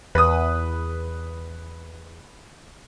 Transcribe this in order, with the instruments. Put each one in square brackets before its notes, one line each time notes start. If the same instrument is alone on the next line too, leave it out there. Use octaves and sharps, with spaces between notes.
[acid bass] E2 [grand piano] B4 D#6